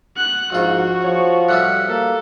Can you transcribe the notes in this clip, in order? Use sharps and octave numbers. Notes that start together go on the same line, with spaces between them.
F#5 F#6
A#1 G#2 F4 F#4
F3 C#5
A2 G3 A3 F#5
A#3 A4